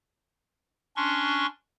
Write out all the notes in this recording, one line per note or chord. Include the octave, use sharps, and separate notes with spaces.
C#4 D4 C6 C#6